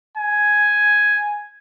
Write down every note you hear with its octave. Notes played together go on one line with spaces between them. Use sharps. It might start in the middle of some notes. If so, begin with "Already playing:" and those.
G#5